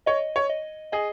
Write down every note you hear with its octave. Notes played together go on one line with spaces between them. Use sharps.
C#5 D#5
C#5
D#5
G#4 D#5